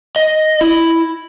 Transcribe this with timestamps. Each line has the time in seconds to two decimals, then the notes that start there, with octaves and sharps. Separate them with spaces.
0.16 D#5
0.61 E4